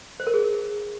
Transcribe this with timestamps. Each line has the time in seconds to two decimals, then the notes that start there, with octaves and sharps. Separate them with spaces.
0.20 C5
0.27 A#4
0.34 G#4